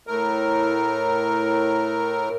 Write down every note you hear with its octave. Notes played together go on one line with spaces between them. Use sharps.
A2 A#4